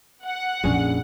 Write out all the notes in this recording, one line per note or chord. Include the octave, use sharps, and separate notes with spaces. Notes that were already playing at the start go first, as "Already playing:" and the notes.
F#5
A#1 F2 C#4 D4 G#4